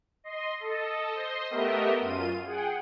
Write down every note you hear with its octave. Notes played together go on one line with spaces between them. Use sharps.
D#5 C6
A4 D#5
C5 D#5 C6
A3 B3 G4 A#4 D#5 E5
F#2 F4 D#7
G#4 F#5 G5